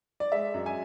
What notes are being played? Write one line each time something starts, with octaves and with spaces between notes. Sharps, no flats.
D5
G#3 E5
F#2
G#5